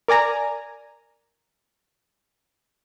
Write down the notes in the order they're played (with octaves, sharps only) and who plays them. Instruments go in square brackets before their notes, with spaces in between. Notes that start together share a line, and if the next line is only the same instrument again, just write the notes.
[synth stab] A#4 D5 G#5 A#5